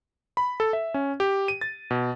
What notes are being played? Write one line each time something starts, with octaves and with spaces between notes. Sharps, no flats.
B5
A4
E5
C#4
G4
D#7
A6
B2